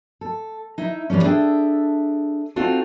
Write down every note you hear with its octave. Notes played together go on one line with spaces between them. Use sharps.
A4
D#4 E4 E5
A2 E3 G3 A3 C#4
D4 G#4 A4 E5 G5
C4 D#4 F4 F#4 A4